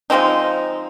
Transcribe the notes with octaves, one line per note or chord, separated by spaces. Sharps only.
F3 G#3 C4 D#4